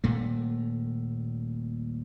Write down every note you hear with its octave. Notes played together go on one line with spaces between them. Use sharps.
D#1 A#2 A3